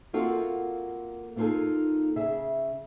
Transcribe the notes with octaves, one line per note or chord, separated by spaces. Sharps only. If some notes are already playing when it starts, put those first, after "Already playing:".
A#3 C4 F4 F#4 A4
A#3 B3 D#4 F4 G#4 A4
C#3 G#4 E5